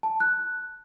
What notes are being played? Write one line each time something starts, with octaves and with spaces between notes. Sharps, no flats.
A5
F#6